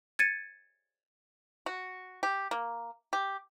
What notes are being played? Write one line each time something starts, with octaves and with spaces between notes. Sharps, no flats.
G#6 A6 C#7 D#7
F#4
G4
A#3
G4